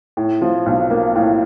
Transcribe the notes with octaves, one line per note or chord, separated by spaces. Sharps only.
A2
F3
B1
A#3
A2